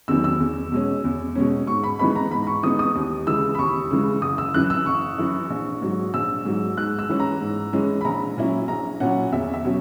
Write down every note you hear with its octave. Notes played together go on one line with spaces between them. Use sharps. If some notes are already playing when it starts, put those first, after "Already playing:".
E2 D#3 F#3 B3 E6
E6
E2
B2 G#3 C#4
E2
B2 G#3 C#4
G#2 C#6
B5
E3 G#3 B3 D#4 B5
A#5
G#2 B5
C#6
E3 G#3 B3 D#4 D#6
D#6
D#2
C#3 E3 G#3 E6
B5
D#2 C#6
C#3 E3 G#3
F#1 D#6
E6
F#2 E3 F#6
E6
F#1 C#6
F#2 E3
A#1
G#2 F#3
A#1 E6
G#2 F#3
G#2 F#6
E6
E3 G#3 C#4
A#5
G#2
E3 G#3 C#4
B5
A#1 A#5
A#2 F#3 C#4 E4
A#1 A#5
A#2 F#3 C#4 E4 F#5
E2 E5
E5
B2 F#3 C#4